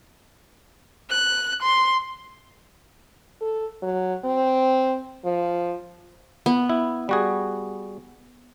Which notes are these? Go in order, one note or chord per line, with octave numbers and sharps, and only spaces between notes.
F#6
C6
A4
F#3
C4
F3
B3
E4
G3 F#4 G#4